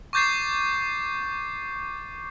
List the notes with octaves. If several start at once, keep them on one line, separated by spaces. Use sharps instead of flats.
C#6 D6 G6 A6 C7